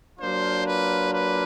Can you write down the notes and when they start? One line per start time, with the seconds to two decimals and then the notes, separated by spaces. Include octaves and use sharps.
0.19 F#3 A#3 D4 F4 C5
0.67 B4
1.14 B4